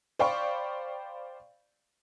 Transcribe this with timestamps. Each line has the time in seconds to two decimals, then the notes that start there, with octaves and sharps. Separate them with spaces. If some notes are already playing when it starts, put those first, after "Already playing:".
0.19 C5 D5 F5 G5 B5 C#6